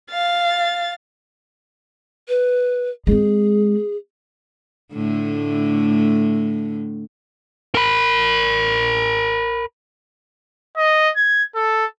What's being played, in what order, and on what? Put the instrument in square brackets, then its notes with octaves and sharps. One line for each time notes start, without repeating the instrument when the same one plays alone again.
[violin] F5 A6
[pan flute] B4
[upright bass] G#3 C4 [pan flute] G#4
[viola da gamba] A2 D3 A3
[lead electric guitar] A#4 B5
[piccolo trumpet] D#5
G#6
A4